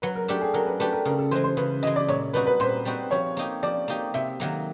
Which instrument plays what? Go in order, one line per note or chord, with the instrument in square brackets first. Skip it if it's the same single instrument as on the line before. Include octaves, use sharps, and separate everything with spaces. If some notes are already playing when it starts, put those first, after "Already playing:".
[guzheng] F#3 [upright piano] B4
[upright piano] A#4
[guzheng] A3 D4 G4 [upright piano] A4
[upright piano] G#4
[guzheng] F#3 [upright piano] A#4
[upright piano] B4
[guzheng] A3 D4 G4 [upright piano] B4
[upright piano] A#4
[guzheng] C#3 [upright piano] A#4
[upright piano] A4
[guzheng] E3 G#3 [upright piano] C5
[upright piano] C5
[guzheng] C#3 [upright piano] B4
[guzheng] E3 G#3 [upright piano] D#5
[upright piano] D5
[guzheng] A#2 [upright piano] C#5
[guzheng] G3 C4 D#4 F#4 [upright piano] B4
[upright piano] B4
[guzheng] A#2 [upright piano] C5
[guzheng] G3 C4 D#4 F#4
[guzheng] F3 [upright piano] C#5
[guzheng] A#3 D#4 G4
[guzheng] F3 [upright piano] D5
[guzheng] A#3 D#4 G4
[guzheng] C3 [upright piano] E5
[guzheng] D#3 F#3 A#3